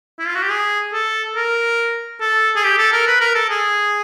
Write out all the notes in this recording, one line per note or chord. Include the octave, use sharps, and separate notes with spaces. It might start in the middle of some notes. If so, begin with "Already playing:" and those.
E4
F4
F#4
G4
G#4
A4
A#4
A4
G#4
G4
A4
A#4
B4
A#4
A4
G#4